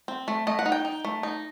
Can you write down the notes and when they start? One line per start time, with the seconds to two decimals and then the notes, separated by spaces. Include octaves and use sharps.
0.08 C4
0.28 A3
0.47 A3 D#5
0.59 F#5
0.66 D#4
0.72 G5
0.85 D#4
1.05 A3
1.23 D#4